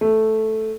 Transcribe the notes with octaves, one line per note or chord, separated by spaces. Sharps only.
A3